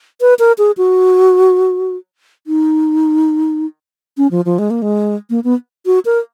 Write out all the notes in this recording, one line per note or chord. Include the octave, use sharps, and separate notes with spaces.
B4
A#4
G#4
F#4
D#4
C#4
F3
F3
G#3
A#3
G#3
A#3
B3
F#4
A#4